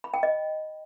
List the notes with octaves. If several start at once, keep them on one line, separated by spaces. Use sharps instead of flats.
B5
G5
D#5